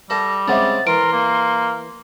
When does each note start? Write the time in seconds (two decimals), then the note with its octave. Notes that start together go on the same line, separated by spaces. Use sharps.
0.10 G3 A4 E5 A#6
0.48 C#3 G#3 C4 E5 F#5 D6 A6
0.87 E3 A#4 C6 D7
1.13 A#3